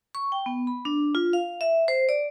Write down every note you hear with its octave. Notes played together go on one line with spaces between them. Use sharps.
C#6
G5
B3
B5
D4
F4
F5
E5
C5
D5